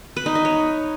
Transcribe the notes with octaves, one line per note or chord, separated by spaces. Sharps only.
B4
D#4
D#5
C#5